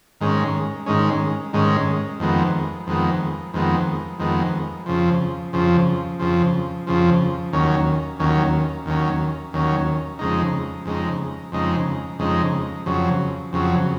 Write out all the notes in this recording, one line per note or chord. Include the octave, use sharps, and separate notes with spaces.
G#2 D#3 G#3 C#4
G#2 D#3 G#3 C#4
G#2 D#3 G#3 C#4
F2 D#3 G#3 B3
F2 D#3 G#3 B3
F2 D#3 G#3 B3
F2 D#3 G#3 B3
F2 C#3 F3
F2 C#3 F3
F2 C#3 F3
F2 C#3 F3
D#2 D#3 F#3 C#4
D#2 D#3 F#3 C#4
D#2 D#3 F#3 C#4
D#2 D#3 F#3 C#4
F2 C#3 G#3 D#4
F2 C#3 G#3 D#4
F2 C#3 G#3 D#4
F2 C#3 G#3 D#4
F2 C#3 F#3
F2 C#3 F#3